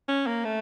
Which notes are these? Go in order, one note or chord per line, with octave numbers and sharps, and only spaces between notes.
C#4
A#3
A3